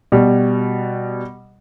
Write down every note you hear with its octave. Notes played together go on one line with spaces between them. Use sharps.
B2 G3